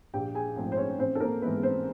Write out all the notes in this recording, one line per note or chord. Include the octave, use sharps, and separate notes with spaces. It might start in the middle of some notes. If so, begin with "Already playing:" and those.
A#1 G4 G5
G#4 G#5
G#2 F3 A3 C4
C5
C#4 C#5
A1 C4 C5
A4
A#3 A#4
G#2 E3 G#3 B3 B4
C4 C5